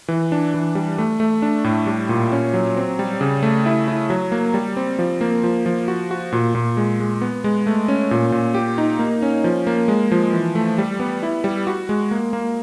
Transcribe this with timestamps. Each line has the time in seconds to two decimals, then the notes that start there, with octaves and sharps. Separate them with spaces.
0.08 E3
0.32 D4
0.54 E3
0.75 G3
0.98 A3
1.20 A3
1.42 D4
1.64 A2
1.87 G3
2.09 A#2
2.32 C#4
2.54 F#3
2.77 C4
2.99 G3
3.21 C#3
3.43 A3
3.66 E4
3.88 E4
4.10 F#3
4.32 A#3
4.54 G3
4.77 C4
4.99 F3
5.21 A#3
5.44 F3
5.66 F3
5.88 F#4
6.11 F#4
6.32 A#2
6.55 A#2
6.77 G#3
7.00 G#3
7.22 B3
7.44 G#3
7.67 A3
7.88 C#4
8.11 A#2
8.32 A#2
8.54 G4
8.78 D#4
8.99 A#3
9.22 C#4
9.44 F3
9.67 A#3
9.88 G#3
10.12 F3
10.33 E3
10.55 A3
10.78 G3
11.00 B3
11.23 E4
11.44 G3
11.67 F#4
11.89 G#3
12.11 A#3
12.33 A#3